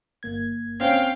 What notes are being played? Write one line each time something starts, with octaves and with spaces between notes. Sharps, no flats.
G1 A#3 G#6
C4 C#4 F5 G5